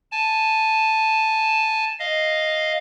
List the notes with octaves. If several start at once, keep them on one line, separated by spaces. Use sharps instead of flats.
G#5 A5
D#5 F5